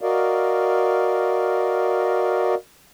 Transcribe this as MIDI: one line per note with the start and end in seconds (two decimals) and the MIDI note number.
0.01 2.55 66
0.01 2.55 70
0.01 2.55 74
0.01 2.55 75
0.01 2.55 77